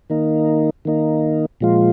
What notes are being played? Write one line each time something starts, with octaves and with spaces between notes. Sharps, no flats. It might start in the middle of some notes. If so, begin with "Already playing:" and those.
D#3 A#3 D#4
D#3 A#3 D#4
A#2 F3 G#3 F4